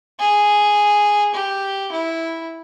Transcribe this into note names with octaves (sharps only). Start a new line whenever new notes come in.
G#4
G4
E4